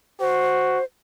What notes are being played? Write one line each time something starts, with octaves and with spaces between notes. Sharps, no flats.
F#4 C5